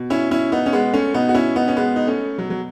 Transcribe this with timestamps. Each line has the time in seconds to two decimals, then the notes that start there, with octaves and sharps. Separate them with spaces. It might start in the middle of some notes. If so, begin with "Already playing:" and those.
Already playing: B2
0.10 C#4 E4
0.31 C#4 E4
0.52 B3 D#4
0.66 C#4
0.73 G#3 B3
0.94 A3 C#4
1.14 B2 B3 D#4
1.29 F#4
1.35 C#4 E4
1.56 B3 D#4
1.68 C#4
1.77 G#3 B3
1.96 D#4
2.07 A3 C#4
2.38 B2 F#3
2.50 F#3